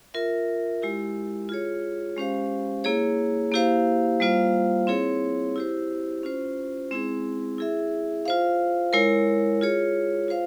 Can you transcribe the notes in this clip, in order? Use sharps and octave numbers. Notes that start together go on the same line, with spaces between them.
F4 A#4 E5
G#3 E4 G4
F4 G#4 C#5
G#3 C#4 G4 C5 F5
A#3 E4 G#4 C#5
A#3 E4 G4 C5 F5
G3 A#3 F4 C5 F5
C4 E4 G#4 C#5
E4 G4 C5
C#4 F4 C5
G#3 C4 E4 G#4
E4 G#4 E5
F4 C5 F5
G#3 E4 A#4 C#5
F4 G#4 C#5
F4 C5 F5